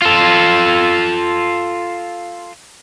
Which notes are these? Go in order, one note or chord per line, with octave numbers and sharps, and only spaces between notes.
F4 A4